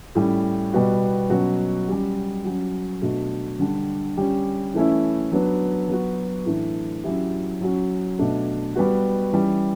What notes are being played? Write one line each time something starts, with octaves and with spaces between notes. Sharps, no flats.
A2 G3 C#4
B2 G3 B3 F#4
B2 F#3 C#4 F#4
G3 C#4 G4
F#3 C#4 F#4
B2 A3 D4 F#4
D3 G3 D4
G3 C#4 G4
E3 A3 C#4 E4
F#3 B3 D4
F#3 B3 F#4
A2 E3 A3 D4
F#3 C#4 E4 G4
F#3 C#4 F#4
B2 A3 D4
G3 B3 F#4
E3 G3 C#4